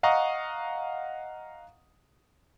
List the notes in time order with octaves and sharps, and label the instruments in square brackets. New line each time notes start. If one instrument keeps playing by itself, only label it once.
[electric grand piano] D#5 F5 F#5 A#5 C#6 D#6